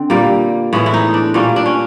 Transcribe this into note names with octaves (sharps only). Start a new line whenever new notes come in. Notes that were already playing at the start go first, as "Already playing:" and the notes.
Already playing: D3 C4
A#2 G3 A#3
A2 E3 G#3 B3
E4
D#4
D4
A#2 G3 A#3 C#4
D4
C#4